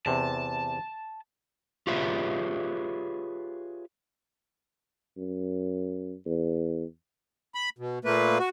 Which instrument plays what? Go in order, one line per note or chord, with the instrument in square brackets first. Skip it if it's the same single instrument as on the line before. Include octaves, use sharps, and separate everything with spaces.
[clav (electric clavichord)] E2 C3 [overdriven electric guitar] A5
[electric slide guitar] F4 G4 G#4 B4 C#5 E5
[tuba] F#2
E2
[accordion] B5
B2
A#2 A3 A#3 B4
F#4